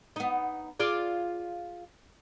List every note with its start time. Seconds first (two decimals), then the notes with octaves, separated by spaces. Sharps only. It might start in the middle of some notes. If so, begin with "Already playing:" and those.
0.16 B3 D#4
0.80 F4 G#4 D5